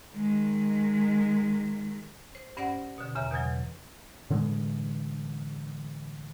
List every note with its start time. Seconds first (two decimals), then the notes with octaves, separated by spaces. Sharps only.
0.15 D#3 G#3
2.35 C5
2.57 G2 C#4 C5 D5 F#5 A#6
2.98 B2 D3
3.15 E2 C#3 E5 A#5
3.31 E2 B2 E3 F#3
4.30 A2 D3 E3 G#3